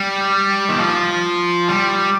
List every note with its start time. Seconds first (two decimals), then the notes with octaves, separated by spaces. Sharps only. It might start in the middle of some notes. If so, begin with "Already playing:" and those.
Already playing: G3
0.69 D#3
0.79 F3
1.68 G3